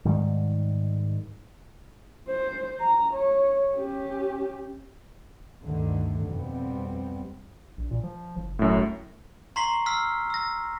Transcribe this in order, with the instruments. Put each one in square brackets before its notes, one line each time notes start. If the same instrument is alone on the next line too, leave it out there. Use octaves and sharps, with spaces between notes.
[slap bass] G#2 D#3 G3
[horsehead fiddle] C5
A#5
C#5
C#4 G4
[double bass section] D2 G2 D3 D#3
F2 B2 G3 B3 C4
[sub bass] A#1
A#2
F3
F#1
[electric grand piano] F#2 A2
[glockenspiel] A#5 C6 C#6 B6 C7 G7
E6 F6 B6 C7
E6 A#6